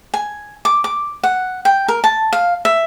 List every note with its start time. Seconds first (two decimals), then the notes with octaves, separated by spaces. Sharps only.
0.14 G#5
0.65 D6
0.84 D6
1.24 F#5
1.65 G5
1.88 A#4
2.04 A5
2.33 F5
2.65 E5